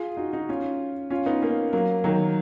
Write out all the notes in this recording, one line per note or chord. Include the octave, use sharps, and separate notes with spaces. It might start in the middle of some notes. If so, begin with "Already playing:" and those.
Already playing: F4 G#4
D#4 F#4
D#4 F#4
C#4 F4
C#4 F4
B3 D#4
A#3 C#4
F#3 A#3
D#3 F#3